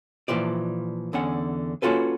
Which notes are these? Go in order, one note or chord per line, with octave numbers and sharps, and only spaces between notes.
A#2 E3 F3 D5
E2 D3 C#4 F#5
A#3 C#4 F4 F#4 A4 B4